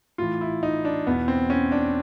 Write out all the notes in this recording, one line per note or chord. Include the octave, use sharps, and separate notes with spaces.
A2 E3 F4
E4
D#4
D4
E2 B2 B3
C4
C#4
D4